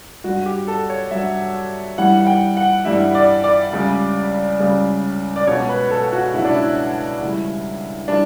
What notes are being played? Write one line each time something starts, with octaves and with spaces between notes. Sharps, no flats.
G2 F#3 F#4
G4
A4
C#5
G2 F#3 E5
G2 E3 G3 F#5
F#5
G5
F#5
G2 E3 G3 E5
D5
D5
C#2 C#3 G3
C#2 C#3 G3
D5
C#2 B2 F#3 C#5
B4
A4
F#4
C#2 B2 F#3 E4
D4
E4
C#2 C#3 E3 G3
E3 G3 D4